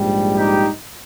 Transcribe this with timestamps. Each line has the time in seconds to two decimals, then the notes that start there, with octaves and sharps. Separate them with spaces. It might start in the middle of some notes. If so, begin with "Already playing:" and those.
Already playing: A#1 G#2 G3
0.36 D#4 G4